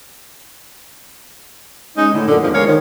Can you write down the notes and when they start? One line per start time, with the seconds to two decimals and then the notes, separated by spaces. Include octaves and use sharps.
1.96 G#3 C#4 D#4
2.13 A2 D3
2.28 F#2 A#2 D3
2.41 E2 G#2 D3 D#3 F3
2.53 G#3 A#4 C#5 F5
2.66 D#3 F3